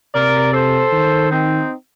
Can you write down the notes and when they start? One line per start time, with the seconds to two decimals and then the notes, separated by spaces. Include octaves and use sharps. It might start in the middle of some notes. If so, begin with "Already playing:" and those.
0.15 C3 A#4 D5
0.53 A4 C5
0.93 D#3
1.31 C4 D#4